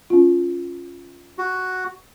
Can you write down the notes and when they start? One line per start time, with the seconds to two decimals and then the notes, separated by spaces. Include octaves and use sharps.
0.10 C#4 F4
1.38 F#4